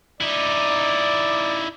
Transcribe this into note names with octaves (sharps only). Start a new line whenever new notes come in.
D#4 E4 D5